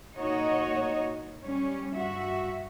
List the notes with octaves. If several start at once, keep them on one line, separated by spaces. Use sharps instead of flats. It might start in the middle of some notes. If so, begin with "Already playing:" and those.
A#2 A#3 D#4 F#4 C#5 D#5
G3 C#4
G2 F#4 E5